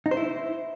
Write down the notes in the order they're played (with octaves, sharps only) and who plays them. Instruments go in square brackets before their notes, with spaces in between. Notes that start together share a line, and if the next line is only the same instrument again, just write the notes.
[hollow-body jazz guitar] D#4
C5
E4